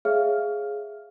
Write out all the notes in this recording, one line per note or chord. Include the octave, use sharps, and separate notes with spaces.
G#4 C#5 E5 F5 F6